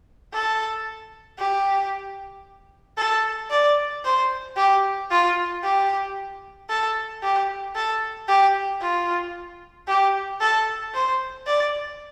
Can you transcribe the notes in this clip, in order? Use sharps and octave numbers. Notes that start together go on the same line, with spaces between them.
A4
G4
A4
D5
C5
G4
F4
G4
A4
G4
A4
G4
F4
G4
A4
C5
D5